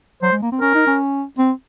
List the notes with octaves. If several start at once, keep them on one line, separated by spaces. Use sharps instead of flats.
F#3 C5
G#3
A#3
C4
C#4 A#4
D#4
C#4
C4